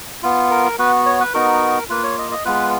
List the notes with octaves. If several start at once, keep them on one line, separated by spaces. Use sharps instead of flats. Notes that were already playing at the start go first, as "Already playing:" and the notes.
B3 F4
A#4
B3 F#4 B4
C#5
B4
B3 D#4 F#4 A#4
A#3 F4 B4
C#5
D#5
D#5
G#3 B3 F4 B4